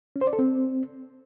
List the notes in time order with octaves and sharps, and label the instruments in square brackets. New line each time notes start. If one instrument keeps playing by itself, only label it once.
[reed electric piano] C#4
C5
D5
A4
C4